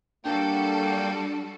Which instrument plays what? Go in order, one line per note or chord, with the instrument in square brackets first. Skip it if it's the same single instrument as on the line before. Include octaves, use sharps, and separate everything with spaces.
[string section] G3 F#4 A4 [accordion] A#3 G5 G6 [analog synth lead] D4